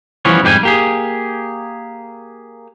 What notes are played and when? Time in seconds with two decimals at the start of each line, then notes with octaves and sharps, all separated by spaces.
0.25 E3 F3 G3 B3 C#4 C#5
0.43 F2 G#2 G3 G4 G5 G#5
0.63 A#3 G4 G#4